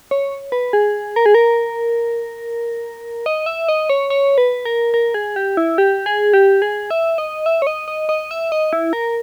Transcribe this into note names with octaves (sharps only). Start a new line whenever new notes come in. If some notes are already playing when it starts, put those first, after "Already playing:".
C#5
B4
G#4
A#4
G#4
A#4
D#5
E5
D#5
C#5
C#5
B4
A#4
A#4
G#4
G4
E4
G4
G#4
G4
G#4
E5
D#5
E5
C#5
D#5
D#5
D#5
E5
D#5
E4
A#4